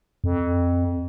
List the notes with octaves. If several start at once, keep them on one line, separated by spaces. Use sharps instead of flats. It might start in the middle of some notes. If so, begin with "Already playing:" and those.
F2